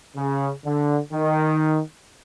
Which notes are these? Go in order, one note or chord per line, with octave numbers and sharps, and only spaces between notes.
C#3
D3
D#3